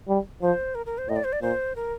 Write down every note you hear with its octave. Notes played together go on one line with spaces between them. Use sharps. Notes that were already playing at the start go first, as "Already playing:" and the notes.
G3
F3 C5
A#4
A#4
C5
A2 D#5
D5
C5
D5
A#2 C5
A#4